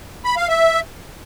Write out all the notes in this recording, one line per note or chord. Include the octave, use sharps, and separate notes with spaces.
B5
F5
E5